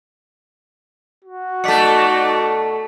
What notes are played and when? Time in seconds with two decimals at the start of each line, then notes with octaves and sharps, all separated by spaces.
1.25 F#4
1.64 B2 A3 D#4 D5 A5 B6 C#7